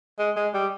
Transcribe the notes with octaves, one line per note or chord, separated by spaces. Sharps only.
G#3
G#3
G3